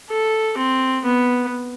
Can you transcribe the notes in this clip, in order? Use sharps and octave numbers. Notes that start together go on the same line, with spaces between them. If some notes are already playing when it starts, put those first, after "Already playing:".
A4
C4
B3